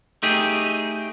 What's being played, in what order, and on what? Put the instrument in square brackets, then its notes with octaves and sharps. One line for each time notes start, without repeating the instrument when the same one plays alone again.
[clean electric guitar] A3 D#4 G4 G#4